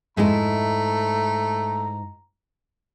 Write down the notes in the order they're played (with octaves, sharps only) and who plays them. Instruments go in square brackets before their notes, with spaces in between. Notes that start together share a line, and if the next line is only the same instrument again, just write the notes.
[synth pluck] F2 G#3 [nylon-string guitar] G#2 E4 [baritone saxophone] A3 [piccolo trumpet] A#5